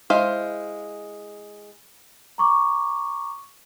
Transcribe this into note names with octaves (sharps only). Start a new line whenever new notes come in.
G#3 E4 C5 F5
A#5 C#6 D6